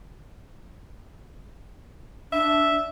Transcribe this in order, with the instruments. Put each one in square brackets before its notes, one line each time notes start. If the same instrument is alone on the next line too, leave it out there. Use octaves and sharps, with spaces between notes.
[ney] D4 [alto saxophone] E5